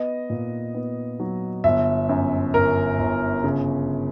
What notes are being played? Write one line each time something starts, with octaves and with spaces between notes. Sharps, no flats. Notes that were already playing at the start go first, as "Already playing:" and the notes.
Already playing: B3 D#5
A#2
B3
F#3
G1 E5
F#2
G1 A#4
G1
C#3